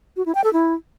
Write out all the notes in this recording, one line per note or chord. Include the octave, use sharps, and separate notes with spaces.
F#4
E4
G5
A4
E4